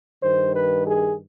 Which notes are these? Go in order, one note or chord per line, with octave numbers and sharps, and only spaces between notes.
G2 D#3 C5
B4
G#4